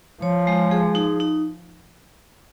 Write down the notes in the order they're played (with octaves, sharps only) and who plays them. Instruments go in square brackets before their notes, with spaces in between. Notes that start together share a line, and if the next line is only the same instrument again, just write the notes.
[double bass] F3 [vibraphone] C#5
[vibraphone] G#3
G#4
D#4
D#4